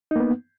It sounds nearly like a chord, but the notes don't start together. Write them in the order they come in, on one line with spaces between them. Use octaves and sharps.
D#4 A#3 B3